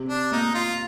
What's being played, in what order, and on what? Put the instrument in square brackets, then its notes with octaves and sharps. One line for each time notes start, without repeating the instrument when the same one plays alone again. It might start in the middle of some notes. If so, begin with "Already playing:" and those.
Already playing: [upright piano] C3
[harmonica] D4
[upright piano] A#3 [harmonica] D#4
[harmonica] F4